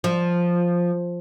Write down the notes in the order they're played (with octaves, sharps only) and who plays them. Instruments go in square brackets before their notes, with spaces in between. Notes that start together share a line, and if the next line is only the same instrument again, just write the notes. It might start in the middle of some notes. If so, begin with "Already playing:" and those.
[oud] F3